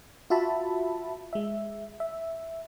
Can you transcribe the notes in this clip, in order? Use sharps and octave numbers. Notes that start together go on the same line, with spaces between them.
F4 F#4 E5 A5 B5
G#3 E5
E5